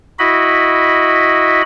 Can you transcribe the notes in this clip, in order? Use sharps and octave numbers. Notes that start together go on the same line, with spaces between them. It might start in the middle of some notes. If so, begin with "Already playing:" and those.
E4 F#4 D#5 B5